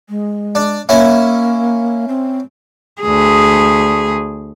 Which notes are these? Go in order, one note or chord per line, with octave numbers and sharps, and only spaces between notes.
G#3
D4
A#3 C#4 E4 E5
C4
D2 G#4